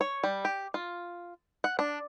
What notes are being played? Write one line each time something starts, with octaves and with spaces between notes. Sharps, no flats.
C#5
G3
G4
F4
F#5
D4